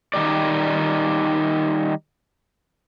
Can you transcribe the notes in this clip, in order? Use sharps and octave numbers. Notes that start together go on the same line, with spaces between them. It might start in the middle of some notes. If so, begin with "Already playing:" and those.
D#3 G3 D#4 D5